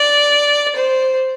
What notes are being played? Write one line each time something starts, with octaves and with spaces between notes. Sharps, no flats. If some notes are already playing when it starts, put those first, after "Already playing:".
Already playing: D5
C5